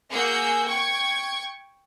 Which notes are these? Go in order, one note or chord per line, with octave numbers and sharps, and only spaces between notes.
A#3 F#4 G#4 E6 G6
G5 C#6 G#6